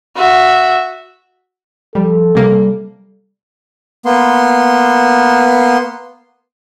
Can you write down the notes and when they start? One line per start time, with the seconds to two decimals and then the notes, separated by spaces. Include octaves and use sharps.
0.16 F#4 E5
1.95 F3 G3 A4
2.35 C3 G3 A#3
4.05 A#3 B3 C6